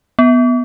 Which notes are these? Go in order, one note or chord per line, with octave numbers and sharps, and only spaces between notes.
B3